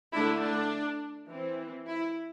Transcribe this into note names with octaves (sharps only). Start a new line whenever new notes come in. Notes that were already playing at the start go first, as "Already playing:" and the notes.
D3 A3 D4 E4
D4
E3 C4
E4